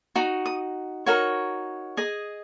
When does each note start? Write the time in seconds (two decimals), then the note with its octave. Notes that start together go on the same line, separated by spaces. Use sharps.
0.16 D#4 F#4
0.46 D#6
1.06 D#4 F#4 A#4 C#5
1.97 G#4 D#5